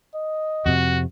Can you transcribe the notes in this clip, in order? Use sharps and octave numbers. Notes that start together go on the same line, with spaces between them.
D#5
F2 C3 F#4